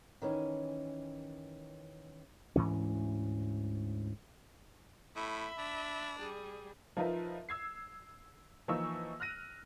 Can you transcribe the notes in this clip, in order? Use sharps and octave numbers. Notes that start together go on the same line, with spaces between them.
D#3 E3 C#4
D2 G#2 E3 C#4
A2 E5 B5
D4
G3 G#4
F3 D#4 F4 A#4 B4 E5
E6 G#6 C7
E3 F3 A#3 D#4 C#6 E6
F6 F#6 A#6 D#7